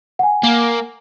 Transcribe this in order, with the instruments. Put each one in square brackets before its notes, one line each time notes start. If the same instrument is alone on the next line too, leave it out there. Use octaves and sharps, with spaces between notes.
[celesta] F#5 G#5
[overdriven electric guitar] A#3